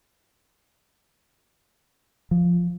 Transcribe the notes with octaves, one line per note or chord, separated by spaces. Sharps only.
F3